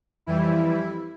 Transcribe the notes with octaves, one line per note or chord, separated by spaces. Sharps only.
F2 E3 G3 E4